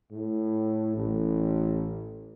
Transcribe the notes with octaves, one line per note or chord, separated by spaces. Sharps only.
A2
A1